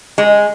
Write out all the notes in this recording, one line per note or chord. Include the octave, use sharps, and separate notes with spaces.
G#3